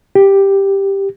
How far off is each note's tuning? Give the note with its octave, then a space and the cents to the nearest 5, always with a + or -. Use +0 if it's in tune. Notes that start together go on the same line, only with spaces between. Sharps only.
G4 +5